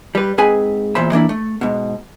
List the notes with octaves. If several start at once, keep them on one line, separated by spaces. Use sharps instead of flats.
G3 B4
G#2 C4 G#4 B4 G#5
E2 A#2 C5 E5 B5
E3 A#3 D4 E4
A3
G#2 B2